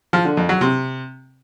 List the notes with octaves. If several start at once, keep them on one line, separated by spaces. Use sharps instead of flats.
F3
D3
F2
F#3
C3